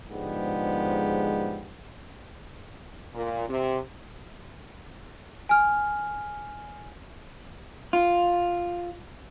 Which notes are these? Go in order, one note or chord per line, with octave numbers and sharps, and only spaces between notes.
G#2 D3 F3 G#3 B3 G4
A#2
C3
G#5 F6
F4